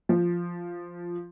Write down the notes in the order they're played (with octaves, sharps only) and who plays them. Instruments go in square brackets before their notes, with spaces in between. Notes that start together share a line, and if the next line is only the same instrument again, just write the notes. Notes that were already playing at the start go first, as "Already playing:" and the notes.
[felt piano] F3